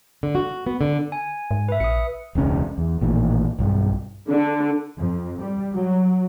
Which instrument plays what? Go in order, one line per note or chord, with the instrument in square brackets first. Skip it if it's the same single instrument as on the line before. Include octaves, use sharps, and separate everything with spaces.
[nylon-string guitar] D3
F#4
B3
D3
[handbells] G#5
[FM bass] G#2
[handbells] B4 E5
[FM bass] A#1 [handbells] D#6 C#7
[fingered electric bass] E1 C#2 C#4
E2
A1 A#2 D#3
B1 G2
[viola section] D3
[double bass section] F2
G3
F#3